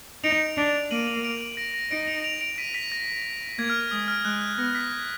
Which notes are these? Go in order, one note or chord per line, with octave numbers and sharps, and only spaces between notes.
D#4 D7 F7
D4
A#3 D#7 F#7
D#7 F#7
D7 F7
D7 F7
A#6 D7
A#6
D#4 A#6 D7
D7 F7
D7 F7
D7 F7
B6 D#7
B6
A#6
A#3 G#6
F6
F6
G#3 D#6
F6
G#3 F#6
G#6
B3 A#6
B6
G#6